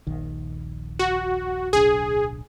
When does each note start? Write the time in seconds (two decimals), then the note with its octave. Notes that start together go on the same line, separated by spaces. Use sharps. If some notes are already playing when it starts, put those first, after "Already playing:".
0.07 D#1 A#1 D#3
0.99 F#4
1.73 D1 B1 D4 G#4